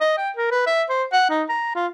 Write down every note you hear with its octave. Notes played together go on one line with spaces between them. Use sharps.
D#5
G5
A#4
B4
E5
C5
F#5
D#4
A#5
F4